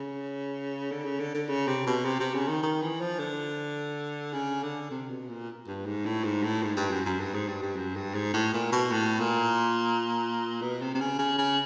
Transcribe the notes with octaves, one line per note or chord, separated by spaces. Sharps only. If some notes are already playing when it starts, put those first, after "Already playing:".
Already playing: C#3
D3
C#3
D3
D3
C#3
C3
B2
C3
C3
C#3
D#3
D#3
E3
F3
D3
C#3
D3
C3
B2
A#2
G2
G#2
A2
G#2
A2
G#2
G2
F#2
F#2
G2
G#2
G2
G2
F#2
G2
G#2
A2
A#2
B2
A2
A#2
B2
C3
C3
C#3
C#3
C#3